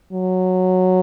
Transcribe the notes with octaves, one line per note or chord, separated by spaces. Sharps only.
F#3